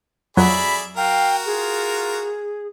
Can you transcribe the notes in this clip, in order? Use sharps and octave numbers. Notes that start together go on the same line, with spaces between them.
F2 F#3 G#4 D5 E5 B5
F#4 A#4 F5 G5
F4 G#4